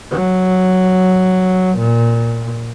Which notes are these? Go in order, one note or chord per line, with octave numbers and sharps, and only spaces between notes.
F#3
A#2